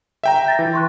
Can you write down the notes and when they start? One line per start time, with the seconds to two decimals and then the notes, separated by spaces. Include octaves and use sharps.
0.24 E5 G5 A#5
0.46 G6 A6 A#6
0.59 E3
0.73 C6 C#6 F#6